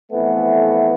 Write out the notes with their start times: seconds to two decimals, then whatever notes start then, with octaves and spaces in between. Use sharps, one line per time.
0.12 F2 E3 A3 B3